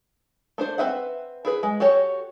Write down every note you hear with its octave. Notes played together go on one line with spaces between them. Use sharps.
A3 D4 C5
C4 B4 E5 F#5
E4 G#4 B4
G#3
F#4 G4 A4 C#5